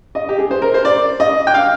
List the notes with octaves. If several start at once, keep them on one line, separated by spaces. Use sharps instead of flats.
D#5
G4
G#4
C5
A#4
C5
D5
D#5
G5
F5